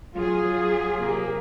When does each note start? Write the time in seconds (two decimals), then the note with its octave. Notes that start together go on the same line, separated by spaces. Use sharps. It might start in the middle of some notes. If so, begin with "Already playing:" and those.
0.15 F#3 F4 G#4
0.99 C3 A#3